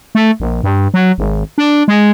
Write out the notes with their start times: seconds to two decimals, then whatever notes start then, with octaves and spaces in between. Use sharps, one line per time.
0.15 A3
0.40 A#1
0.64 G2
0.94 F#3
1.18 G#1
1.58 D4
1.88 G#3